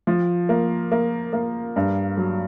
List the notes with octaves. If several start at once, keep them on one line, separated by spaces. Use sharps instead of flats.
F3
A#3
A#3
A#3
G2
F#3